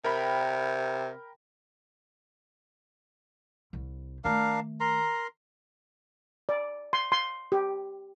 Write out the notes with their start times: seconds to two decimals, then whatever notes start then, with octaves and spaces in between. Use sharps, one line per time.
0.04 C3 A#4 G5 B5
3.73 C2
4.24 D#3 A3 D4 A#4 F5
4.80 A#4 A#5 C6
6.49 D5
6.93 C6
7.12 C6
7.52 G4